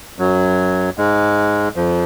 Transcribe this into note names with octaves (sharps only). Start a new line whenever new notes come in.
F#2 F#3
G#2 G#3
F2 F3